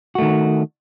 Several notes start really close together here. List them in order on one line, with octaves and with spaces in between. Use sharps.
F#4 A3 D#3